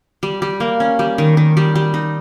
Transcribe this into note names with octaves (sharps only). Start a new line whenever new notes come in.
G3
G3
A#3
C#4
G3
D#3
D#3
G3
G3
D#4